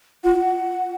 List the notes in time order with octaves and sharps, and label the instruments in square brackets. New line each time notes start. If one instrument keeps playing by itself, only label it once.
[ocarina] F4 [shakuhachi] F#5